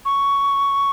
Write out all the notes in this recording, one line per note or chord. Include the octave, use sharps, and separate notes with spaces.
C#6